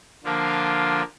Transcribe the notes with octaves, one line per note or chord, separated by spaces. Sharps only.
D3 F3 A#3 D4 F4